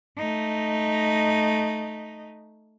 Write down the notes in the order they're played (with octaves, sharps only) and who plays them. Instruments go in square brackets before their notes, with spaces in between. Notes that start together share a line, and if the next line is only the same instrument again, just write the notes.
[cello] A3 D#4